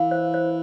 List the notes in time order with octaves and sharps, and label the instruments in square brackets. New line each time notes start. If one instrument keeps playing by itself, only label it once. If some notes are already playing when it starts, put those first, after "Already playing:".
Already playing: [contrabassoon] E3 [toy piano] F5
[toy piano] C5
C5